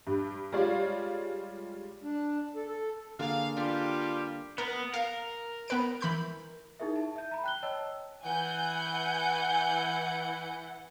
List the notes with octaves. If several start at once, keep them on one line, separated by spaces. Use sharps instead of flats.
G2
G3 G#3 F4 C#5 D5 F5
D4
A4
A4
D3 A#3 G#4 F5
G3 D4 F4 G4
B3 A#4
A#4 F5
B3 B4 D7
E3 B5 G6
D#4 E4 G#4 A#4 E5
A5
E5 G6
A#5 B5
G5 F#6 G7
C#5 D#5 G5 A5 E6
E3 F#5 G#5 G6